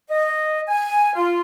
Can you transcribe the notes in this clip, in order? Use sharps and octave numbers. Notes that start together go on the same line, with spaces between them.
D#5
G#5
F4